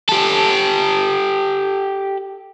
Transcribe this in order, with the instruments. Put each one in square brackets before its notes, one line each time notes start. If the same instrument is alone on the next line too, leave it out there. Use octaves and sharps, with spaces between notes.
[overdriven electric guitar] G4 A4